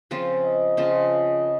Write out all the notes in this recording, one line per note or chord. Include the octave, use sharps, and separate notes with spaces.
C#3 F3 C4 F4
D#5
C#3 F3 C4 F4